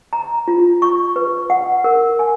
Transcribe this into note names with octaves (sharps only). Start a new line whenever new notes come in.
A#5
F4
C#6
B4
F#5
A#4
G#5